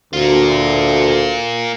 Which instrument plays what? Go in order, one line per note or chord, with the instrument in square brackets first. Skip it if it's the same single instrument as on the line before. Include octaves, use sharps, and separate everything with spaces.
[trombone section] D2 [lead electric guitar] A#3 F4